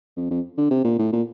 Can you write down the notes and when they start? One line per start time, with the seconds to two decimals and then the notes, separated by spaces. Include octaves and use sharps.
0.17 F2
0.30 F2
0.57 D3
0.71 C3
0.84 A#2
0.98 A2
1.13 A#2